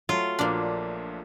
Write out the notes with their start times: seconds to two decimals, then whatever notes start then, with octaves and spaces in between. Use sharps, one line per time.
0.09 F#3 A3 F4
0.39 A#1 A#2 F3 A#3 D4